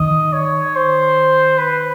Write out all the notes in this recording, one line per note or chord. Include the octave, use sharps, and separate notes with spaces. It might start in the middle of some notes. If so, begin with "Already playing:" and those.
Already playing: D#3 D#5
C#5
C5
B4